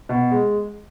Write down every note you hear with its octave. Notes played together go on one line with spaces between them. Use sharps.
B2
G#3